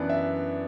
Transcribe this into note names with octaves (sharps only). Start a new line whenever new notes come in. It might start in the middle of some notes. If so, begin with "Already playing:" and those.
Already playing: F#2 E3 B3 D4 D5
E5